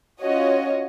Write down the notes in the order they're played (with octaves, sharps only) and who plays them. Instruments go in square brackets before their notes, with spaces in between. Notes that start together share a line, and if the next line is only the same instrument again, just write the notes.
[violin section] C#4 F4 F#4 C#5 D#5